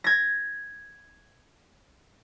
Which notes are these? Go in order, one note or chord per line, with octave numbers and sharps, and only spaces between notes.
G#6 A#6